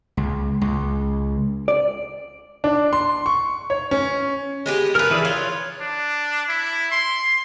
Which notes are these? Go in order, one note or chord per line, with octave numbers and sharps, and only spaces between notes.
C#2
C#2
D5
D4
C6
C#6
C#5
C#4
G#3 B3 G4
F3 A#4 B4 F6
E3 G#4 D5
F4 C#5
D4
E4
C6